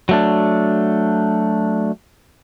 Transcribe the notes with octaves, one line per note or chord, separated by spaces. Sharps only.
F#3 A3 D4